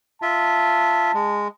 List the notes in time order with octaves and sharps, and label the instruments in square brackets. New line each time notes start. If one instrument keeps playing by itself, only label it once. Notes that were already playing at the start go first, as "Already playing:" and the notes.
[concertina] F4 E5 [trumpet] A5
[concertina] G#3